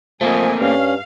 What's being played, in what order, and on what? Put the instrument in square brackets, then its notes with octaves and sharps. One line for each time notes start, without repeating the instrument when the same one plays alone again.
[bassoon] F3 [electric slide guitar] A3 A#3 C4 [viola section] A#4 D#5 G#5
[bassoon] G2 [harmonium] C#4 [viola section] F5